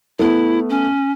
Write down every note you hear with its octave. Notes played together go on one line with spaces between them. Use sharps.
A3 B3 E4
C#4